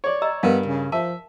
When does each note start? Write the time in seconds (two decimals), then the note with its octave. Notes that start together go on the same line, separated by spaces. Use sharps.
0.04 C#5 D5
0.22 D#5 A#5 E6
0.43 G2 B3 A#4 F5
0.66 C#3
0.92 F3 E5 A5